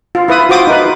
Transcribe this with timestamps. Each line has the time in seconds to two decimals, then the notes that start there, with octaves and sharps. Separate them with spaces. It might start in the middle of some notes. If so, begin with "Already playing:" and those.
0.15 F4
0.28 E4 B4 D#6
0.49 F4 F#4 C5 D6 D#6
0.67 D#4 B4